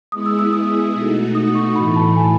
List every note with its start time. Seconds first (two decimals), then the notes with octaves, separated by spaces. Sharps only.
0.12 G#3 B3 E4 G#4 D#6
0.26 E6
0.39 E6
0.53 D#6
0.94 B2 A3 D#4 F#4
1.35 D#6
1.55 C#6
1.75 A2 E3 A3 B5
1.96 A5
2.16 G#5